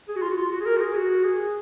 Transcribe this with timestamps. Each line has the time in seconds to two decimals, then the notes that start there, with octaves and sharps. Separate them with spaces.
0.08 G#4
0.16 F#4
0.22 F4
0.30 F#4
0.37 F4
0.52 F#4
0.61 G#4
0.66 A#4
0.76 F#4
0.80 G#4
0.95 F#4
1.24 G#4